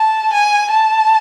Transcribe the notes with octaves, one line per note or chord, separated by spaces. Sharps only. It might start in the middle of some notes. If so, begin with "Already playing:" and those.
Already playing: A5
G#5
A5